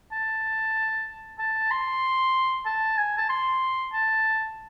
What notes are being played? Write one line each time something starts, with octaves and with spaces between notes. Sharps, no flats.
A5
A5
C6
A5
G#5
A5
C6
A5